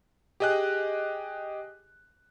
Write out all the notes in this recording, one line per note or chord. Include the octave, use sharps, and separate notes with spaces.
G4 G#4 D#5 G#5 F#6